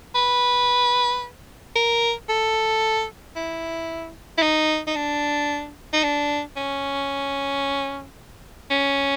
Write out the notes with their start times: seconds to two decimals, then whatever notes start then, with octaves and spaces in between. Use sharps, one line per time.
0.15 B4
1.76 A#4
2.29 A4
3.36 E4
4.38 E4
4.42 D#4
4.87 D#4
4.96 D4
5.93 D#4
6.04 D4
6.56 C#4
8.71 C#4